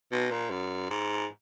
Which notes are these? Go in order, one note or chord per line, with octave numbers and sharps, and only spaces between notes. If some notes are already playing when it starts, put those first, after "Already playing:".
B2
A#2
F#2
G#2